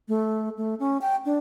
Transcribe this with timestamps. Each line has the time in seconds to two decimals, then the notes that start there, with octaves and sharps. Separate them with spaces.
0.08 A3
0.57 A3
0.80 C#4
1.01 G5
1.25 D4